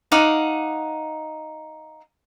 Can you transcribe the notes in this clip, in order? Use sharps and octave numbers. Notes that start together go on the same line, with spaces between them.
D#4 F5 F#5 D6